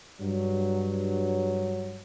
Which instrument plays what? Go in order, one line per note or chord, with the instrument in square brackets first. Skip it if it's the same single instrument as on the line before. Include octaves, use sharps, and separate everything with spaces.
[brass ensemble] G2 F#3